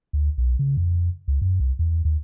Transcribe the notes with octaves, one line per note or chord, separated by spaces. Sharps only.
D2
B1
C#3
F2
C#2
F#2
C2
E2
D#2